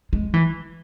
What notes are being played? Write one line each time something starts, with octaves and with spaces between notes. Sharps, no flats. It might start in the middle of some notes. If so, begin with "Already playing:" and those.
G#3
E3